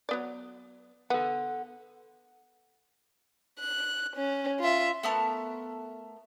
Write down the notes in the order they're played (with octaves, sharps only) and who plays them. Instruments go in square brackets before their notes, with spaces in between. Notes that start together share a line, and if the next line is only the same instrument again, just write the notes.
[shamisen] F#3 B3 D5
[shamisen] B3 [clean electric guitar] A4 F#5
[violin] F#6
C#4
F4 E5
[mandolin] A3 B3 A#4 A5